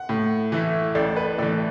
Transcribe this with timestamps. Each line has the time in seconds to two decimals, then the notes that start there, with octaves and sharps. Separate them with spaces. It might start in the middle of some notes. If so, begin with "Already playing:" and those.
Already playing: F#5
0.09 A2
0.52 E3 A3 E4
0.95 A1 A4 D5
1.16 B4
1.38 A2 E3 A4 D5